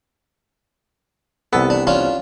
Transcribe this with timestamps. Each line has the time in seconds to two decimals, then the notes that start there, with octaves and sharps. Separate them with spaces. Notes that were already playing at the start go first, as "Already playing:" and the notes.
1.53 C2 B3 A4
1.70 D4
1.87 C#4 D4 F4